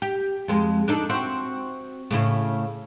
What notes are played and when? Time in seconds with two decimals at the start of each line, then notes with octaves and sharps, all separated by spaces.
0.02 G4
0.48 F2 G#3
0.88 D4 D#4 A4
1.09 C4 F#4 E5
2.11 A2 C#3 E4